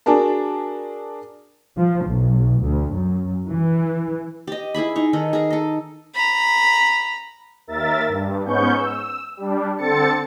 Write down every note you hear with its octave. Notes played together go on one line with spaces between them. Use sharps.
D4 F#4 G#4 A#4 A5
F3
B1
D2
F#2
E3
G4 D#5
E4 G#4 G#5 B5
D#4 C#6
D#3 A4 D#5
G#4 A#4
A4 D#5
A#5 B5
D#2 A#4 E5 A6
G2
G#2 B3 C#4 C#6 G6
E6
G3 D4
D3 C4 A4 A6 C#7